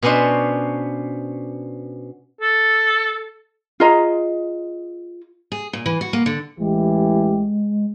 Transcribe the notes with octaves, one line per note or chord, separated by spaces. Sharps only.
B2 B3 C#4 D4 C5
A4
F4 G#4 D#5 A#5
G#4
A#2
E3
F#4
A#3
D3
A1 E3 G#3 G4